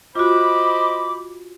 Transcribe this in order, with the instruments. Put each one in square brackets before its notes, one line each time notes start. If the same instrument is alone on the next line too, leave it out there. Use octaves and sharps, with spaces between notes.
[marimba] F4 F#4 [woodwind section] C5 D#5 B5 [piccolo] D6